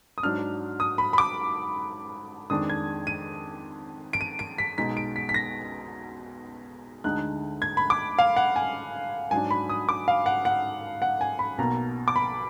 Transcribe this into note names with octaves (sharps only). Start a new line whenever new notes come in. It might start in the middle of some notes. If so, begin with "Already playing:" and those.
D#6
G#2 F#3 D4 F6
D#6
B5
B5
D6
F2 D#3 G#3 D4 D#6
G#6
D#7
D7
D#7
D7
B6
B1 B2 G#3 D#4 B6
D7
B6
B6
A#6
D2 D3 G#3 D#4 F#6
G#6
B5
D6
F5
F#5
G#5
G#2 F#3 D4 G#5
B5
D#6
D6
F5
F#5
F#5
F#5
G#5
B5
B1 B2 A#3 A#5
D6
B5